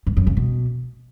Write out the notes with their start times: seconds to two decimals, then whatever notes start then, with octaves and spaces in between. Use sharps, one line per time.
0.07 G2
0.17 F#2
0.27 C#3
0.37 B2